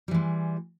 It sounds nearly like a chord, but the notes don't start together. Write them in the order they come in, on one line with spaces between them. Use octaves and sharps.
G3 E3 G#3